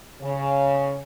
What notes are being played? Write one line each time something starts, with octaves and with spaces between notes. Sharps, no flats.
C#3